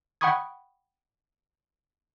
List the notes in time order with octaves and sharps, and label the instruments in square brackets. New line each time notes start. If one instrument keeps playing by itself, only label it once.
[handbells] F#5 G5 B5 C#6 D#6 G#6